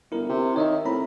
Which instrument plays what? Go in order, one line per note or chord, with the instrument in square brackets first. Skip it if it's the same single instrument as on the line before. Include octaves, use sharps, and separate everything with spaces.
[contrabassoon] G1 [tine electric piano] E4 A#4
[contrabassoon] C3
[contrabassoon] D#3 [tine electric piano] C#5 D#5 E5
[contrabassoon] A2 [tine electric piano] C4 A#5 B5